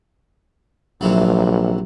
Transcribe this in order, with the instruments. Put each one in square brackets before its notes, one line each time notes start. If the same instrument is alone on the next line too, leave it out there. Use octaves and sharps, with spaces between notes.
[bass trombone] A#1 [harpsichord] C3 E3 F#3